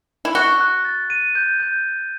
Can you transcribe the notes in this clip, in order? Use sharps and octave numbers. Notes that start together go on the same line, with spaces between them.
E4
F#4 G7
F#6
A6
D#7
G6
G6